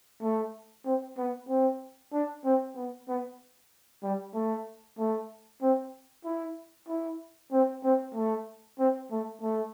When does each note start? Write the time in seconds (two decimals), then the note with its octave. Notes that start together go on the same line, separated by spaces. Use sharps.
0.22 A3
0.85 C4
1.17 B3
1.48 C4
2.13 D4
2.45 C4
2.75 B3
3.08 B3
4.03 G3
4.34 A3
4.98 A3
5.62 C4
6.25 E4
6.88 E4
7.52 C4
7.84 C4
8.15 A3
8.79 C4
9.11 A3
9.42 A3